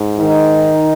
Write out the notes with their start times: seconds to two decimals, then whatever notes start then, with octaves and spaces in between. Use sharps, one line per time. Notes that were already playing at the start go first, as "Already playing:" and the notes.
Already playing: G#2
0.18 D#3 D#4